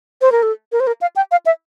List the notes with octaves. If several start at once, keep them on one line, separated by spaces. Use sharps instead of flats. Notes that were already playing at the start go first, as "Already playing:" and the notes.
C5
A#4
A4
A#4
C5
A#4
F5
G5
F5
E5